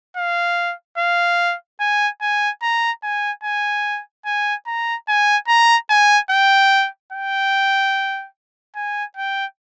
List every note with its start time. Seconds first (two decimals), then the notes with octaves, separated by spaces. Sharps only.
0.17 F5
0.98 F5
1.80 G#5
2.21 G#5
2.62 A#5
3.03 G#5
3.44 G#5
4.26 G#5
4.67 A#5
5.08 G#5
5.48 A#5
5.90 G#5
6.31 G5
7.13 G5
8.76 G#5
9.17 G5